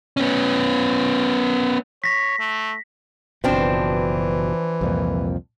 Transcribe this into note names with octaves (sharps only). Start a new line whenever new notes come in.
B3 C#4
C#5 A#6 B6
A3
F#1 B2 E3 F3 C4 D4
C2 F2 A#2